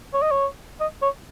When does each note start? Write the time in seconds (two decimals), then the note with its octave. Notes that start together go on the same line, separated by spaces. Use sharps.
0.14 C#5
0.22 D#5
0.31 C#5
0.80 D#5
1.02 C#5